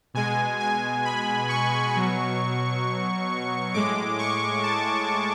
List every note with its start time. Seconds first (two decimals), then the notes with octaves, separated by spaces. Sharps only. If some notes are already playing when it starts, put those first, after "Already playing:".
0.14 B2 G#3 G#5
0.59 G#5
1.05 B5
1.49 C#6
1.95 B2 F#3
3.74 A2 G#3 D6
4.19 C#6
4.63 A5